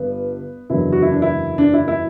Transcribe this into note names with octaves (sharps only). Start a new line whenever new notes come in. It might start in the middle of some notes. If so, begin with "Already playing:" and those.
Already playing: G1 G2 B3 B4
F#1 E2 D3 F#3 E4
F#4
E4
D4
E4
D4
E4
E4